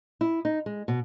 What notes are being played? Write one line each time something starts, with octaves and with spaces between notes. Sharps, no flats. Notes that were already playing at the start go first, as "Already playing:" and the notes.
E4
D#4
G#3
B2